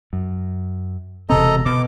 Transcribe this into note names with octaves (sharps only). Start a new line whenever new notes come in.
F#2
E1 C3 C4 A4 D#5 A#5
B2 D6